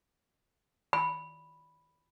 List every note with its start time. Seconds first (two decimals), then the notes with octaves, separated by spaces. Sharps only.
0.93 B5